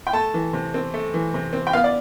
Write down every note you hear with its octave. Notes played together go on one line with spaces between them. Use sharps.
G5
A3 A5
E3
C3
C4
A3
E3
C3
C4
G5
B3 F5
D5